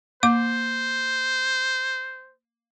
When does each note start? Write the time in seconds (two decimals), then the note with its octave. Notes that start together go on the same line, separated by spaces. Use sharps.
0.23 A#3 C5 D6